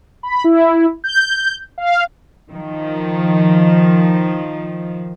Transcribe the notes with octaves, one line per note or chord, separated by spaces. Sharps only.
B5
E4
G6
F5
D#3 F3